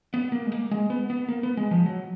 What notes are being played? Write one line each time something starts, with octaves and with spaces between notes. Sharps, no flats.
B3
A#3
G#3
A#3
G#3
B3
B3
A#3
B3
G#3
F3
F#3